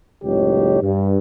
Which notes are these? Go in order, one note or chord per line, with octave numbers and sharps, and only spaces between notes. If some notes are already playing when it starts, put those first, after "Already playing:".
F#1 C#2 A2 D#4 G4 C#5
G2